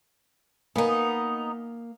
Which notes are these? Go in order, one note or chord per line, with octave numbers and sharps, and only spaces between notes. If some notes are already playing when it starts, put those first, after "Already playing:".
A#3 B3 D#4 G#5